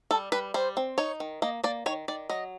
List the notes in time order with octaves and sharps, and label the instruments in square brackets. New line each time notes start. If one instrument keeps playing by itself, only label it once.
[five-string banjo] G3 A4
G3 B4
G3 C5
C4
D#4 C#5
D#3
A#3 D#5
A#3 D5
D#3 C#5
D#3 D5
F#3 D#5